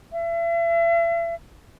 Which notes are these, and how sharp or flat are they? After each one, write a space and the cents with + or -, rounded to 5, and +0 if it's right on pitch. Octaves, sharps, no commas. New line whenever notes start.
E5 +40